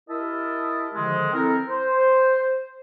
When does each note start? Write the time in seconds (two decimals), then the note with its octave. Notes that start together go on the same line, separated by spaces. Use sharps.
0.09 E4 G4 A#4 D#5 E5 A5
0.95 D3 D#3 F3 G#3
1.33 C4 E4 A4 A#4
1.69 C5